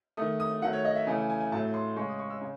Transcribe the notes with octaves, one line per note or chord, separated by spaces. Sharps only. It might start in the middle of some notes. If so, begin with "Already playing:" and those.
D#3 A3 D#6
D#6
D#3 F#3 A3 F#5
C#5
D#5
E5
C#3 E3 A3 G#5
G#5
G#5
G#5
A2 F#3 A3 A5
C6
C#3 G#3 C#6
D#6
C#6
E6
C#3